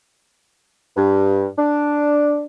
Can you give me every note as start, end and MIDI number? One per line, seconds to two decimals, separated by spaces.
0.97 1.46 43
1.58 2.45 62